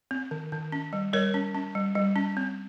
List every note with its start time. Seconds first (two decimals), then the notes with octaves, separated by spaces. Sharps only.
0.11 C4
0.31 D#3
0.52 D#3
0.72 C#4
0.93 G3
1.13 G3 A#4 C#5
1.34 C#4
1.55 C#4
1.75 G3
1.95 G3
2.16 C#4
2.37 C4